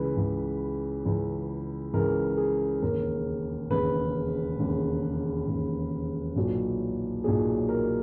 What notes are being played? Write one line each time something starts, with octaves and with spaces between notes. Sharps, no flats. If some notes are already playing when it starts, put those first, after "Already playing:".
Already playing: C#2 C#3 E3 B4
C#2 C#3 E3
C#2 C#3 E3
C#2 C#3 E3 A#4
G#4
E1 D#2 C#3 A#4
E1 D#2 C#3 B4
E1 D#2 C#3
E1 D#2 C#3
B1 A#2 F#3
B1 A#2 F#3 G#4
A#4